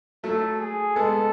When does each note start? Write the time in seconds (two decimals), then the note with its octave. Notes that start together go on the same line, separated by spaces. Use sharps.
0.24 F#3 A3 A4
0.60 G#4
0.96 G#3 B3 A4